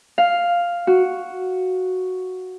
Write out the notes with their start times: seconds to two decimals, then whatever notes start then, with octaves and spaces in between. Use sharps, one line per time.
0.18 F5
0.87 F#4